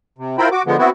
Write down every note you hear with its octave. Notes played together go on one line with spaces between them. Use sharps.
C3
E4 F4 A#4 C5 G5 B5
F#4 D6
D3 F3 G#3 B3
B3 C4 E4 F#4